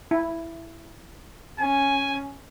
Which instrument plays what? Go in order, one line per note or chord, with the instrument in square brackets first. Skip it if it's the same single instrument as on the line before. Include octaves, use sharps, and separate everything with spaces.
[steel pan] E4
[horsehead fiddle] C#4 [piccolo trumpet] G#5